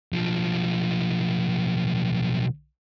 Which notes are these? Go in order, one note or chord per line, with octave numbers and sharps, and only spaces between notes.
B1 F3